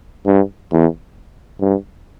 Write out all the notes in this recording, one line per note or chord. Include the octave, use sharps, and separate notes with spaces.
G2
E2
G2